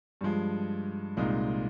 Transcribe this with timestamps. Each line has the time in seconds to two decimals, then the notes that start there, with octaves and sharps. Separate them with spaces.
0.21 G2 F3 G#3
1.17 C2 A#2 G#3 D#4